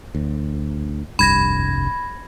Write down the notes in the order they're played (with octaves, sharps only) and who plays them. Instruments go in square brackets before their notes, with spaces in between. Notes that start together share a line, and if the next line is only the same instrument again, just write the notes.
[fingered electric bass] D2
[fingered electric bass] F1 C2 G2 [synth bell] B5 G#6 A#6